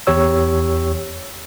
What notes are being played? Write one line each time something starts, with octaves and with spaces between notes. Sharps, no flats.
E2 G4 C#5 E6